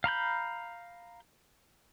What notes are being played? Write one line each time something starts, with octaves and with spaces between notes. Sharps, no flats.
F5 A#5 B5 G6